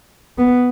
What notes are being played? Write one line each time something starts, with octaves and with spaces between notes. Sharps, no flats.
B3